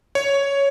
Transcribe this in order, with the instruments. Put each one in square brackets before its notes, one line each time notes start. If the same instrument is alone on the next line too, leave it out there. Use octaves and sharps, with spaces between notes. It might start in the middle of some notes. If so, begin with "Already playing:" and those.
[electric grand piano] C#5